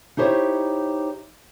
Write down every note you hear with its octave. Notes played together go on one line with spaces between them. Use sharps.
D#4 E4 G4 C5 C#5